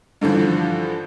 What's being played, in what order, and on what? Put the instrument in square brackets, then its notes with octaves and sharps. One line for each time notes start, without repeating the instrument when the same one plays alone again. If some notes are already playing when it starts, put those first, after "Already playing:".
[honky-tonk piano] G2 D3 E3 F3